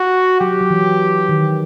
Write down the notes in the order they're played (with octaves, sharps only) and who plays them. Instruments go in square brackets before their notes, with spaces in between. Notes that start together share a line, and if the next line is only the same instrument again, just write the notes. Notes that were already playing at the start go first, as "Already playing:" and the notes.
Already playing: [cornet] F#4
[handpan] F#3 [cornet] G4
[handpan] F#3
E3
D#3